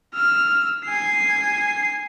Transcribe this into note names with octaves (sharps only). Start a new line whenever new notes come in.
E6 F6
G#5 C7